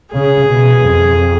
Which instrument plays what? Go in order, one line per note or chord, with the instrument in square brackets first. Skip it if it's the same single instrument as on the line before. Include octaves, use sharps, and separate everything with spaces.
[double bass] C#3 [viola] G#4
[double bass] B2
F2